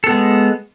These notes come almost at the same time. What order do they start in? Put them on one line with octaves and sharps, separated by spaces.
A4 B3 G#3